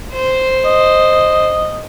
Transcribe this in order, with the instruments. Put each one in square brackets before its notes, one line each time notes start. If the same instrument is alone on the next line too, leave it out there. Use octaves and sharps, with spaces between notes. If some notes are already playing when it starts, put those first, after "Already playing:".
[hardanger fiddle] C5
[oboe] D#5